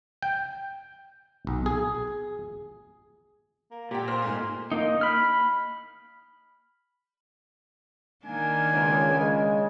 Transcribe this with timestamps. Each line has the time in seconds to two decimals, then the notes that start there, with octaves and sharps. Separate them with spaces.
0.22 G5
1.47 B1
1.66 G#4
3.71 A#3
3.91 A#2 G4 A#4 G5
4.07 C5 A#5 C6 F6
4.22 G#2 A3 G#5
4.72 A#3 D#4
5.01 B5 F6
8.26 D#3 A#3 D4 G#5
8.71 C#2 C#4
9.10 C#3 G#3